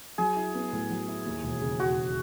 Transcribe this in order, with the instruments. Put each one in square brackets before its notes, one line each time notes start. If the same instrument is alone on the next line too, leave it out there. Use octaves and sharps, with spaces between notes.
[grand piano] F#3 [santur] G#4
[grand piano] E4
B3
A2
F#3
E4
D#2
E1
C#3
[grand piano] E1 [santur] F#4